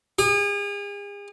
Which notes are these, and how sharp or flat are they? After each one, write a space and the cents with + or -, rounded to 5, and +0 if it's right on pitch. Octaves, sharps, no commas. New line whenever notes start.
G#4 -40